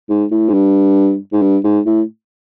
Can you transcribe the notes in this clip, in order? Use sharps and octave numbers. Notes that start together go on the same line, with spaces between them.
G#2
A2
G#2
G2
G#2
G2
G#2
A2